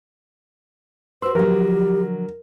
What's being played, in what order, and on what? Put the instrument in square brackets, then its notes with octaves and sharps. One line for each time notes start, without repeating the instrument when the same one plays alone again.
[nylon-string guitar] F#4 B4 [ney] C5 [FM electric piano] C6 E6
[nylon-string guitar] D3 F#3 [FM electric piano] F3 [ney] G4 [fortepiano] A#4